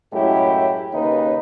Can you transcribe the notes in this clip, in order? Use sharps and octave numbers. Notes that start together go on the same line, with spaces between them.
F#2 A2 G#3 E4 G4
D#2 C#3 A#3 D#4 B4